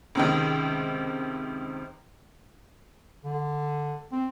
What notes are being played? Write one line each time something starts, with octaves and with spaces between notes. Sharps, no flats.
C#2 C3 D#3
D3
C4